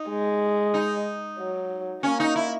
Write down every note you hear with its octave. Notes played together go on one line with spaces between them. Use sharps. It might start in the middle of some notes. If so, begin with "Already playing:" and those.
Already playing: D#4
G#3
D#4
F#3
A#3 C#4
D#4
E4